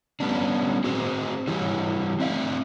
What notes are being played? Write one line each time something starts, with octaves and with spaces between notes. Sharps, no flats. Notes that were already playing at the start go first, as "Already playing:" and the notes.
G3 B3 C#4 D4
C4 F#4 G#4 C5
E3 G3 E4 G4 C#5
C4 D5 E5 F5